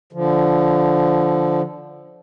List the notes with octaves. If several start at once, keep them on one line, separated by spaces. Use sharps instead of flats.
D3 F3